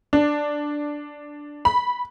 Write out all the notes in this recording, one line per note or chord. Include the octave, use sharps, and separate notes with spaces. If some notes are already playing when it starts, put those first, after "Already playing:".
D4
B5